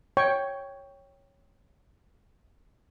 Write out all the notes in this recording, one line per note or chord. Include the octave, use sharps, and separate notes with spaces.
C#5 G5 C#6